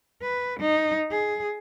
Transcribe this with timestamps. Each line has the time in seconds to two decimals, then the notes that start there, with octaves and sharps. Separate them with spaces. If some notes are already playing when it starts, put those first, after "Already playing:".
0.22 B4
0.60 D#4
1.11 G#4